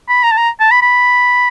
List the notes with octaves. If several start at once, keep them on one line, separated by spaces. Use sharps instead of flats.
B5
A#5
A5
A#5
A5
B5
B5